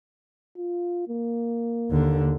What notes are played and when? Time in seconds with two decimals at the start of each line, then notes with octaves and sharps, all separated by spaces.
0.57 F4
1.09 A#3
1.91 D#2 D3